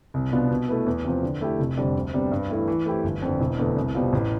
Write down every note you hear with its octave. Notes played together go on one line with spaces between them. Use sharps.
C2
B2 B3 D4 F4
B2
A3 E4 B4
E2
C3 F3
D3
A3 E4 G4
F1
F2 D3 G3
D2
C3 G3 B3 D4
G2
E3 A3 E4
E3
A3 C4 E4 G4
G1
F2 D3
E1
E2 D3 A3
C2
B2 G3 C4 F4
A1